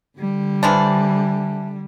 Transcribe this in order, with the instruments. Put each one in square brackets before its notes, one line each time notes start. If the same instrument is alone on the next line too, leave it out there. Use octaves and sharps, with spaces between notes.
[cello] D3 G3
[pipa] E3 F3 D4